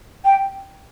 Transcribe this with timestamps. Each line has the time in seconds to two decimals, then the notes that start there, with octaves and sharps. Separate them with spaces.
0.24 G5